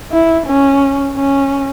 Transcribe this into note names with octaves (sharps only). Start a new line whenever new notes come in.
E4
C#4
C#4